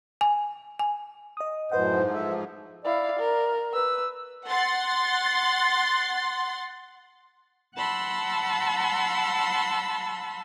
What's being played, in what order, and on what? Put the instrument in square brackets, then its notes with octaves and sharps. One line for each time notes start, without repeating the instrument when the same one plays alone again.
[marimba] G#5
G#5
[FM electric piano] D#5 D#6
[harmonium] F#2 A2 C5 [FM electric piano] B4 D#5 F#5
[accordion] G#2 F3
[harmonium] A4 E5
[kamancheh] E4 F5 [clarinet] D5
[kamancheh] A#4
[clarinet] B4 [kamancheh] E6
[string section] F#5 C6 A6
[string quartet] F#5 A5 B5 C6 E6